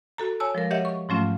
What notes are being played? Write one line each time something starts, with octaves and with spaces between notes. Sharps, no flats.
F#4 A4 A#5
C#5 G#5 A5 E6
F3 G#3 A#4
G4 A#4 C#5 D#5 E5 F#5
C#6
G#2 F3 F#3 A3 C#4 F4